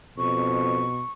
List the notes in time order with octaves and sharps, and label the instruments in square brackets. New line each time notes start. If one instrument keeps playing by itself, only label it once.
[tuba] F2 [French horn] B2 [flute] C#6